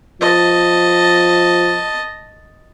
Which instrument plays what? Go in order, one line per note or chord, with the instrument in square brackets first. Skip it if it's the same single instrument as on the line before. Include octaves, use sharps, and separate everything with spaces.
[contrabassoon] F3 [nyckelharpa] D#5 A5